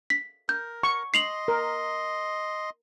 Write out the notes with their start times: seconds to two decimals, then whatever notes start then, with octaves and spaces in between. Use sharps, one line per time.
0.10 B6
0.49 A#4 G6
0.83 C#6
1.14 D#5 C6 C7 F7 F#7
1.48 A#4